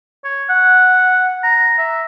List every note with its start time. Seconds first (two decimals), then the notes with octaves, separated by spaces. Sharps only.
0.24 C#5
0.50 F#5
1.43 A#5
1.78 E5